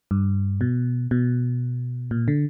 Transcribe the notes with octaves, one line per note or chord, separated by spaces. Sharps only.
G2
B2
B2
A#2
D3